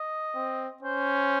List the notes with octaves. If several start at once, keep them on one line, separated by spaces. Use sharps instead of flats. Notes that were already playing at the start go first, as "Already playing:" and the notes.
Already playing: D#5
C4
C#4 C5